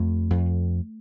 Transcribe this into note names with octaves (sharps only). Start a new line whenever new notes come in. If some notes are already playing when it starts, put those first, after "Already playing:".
Already playing: F2 A3
F2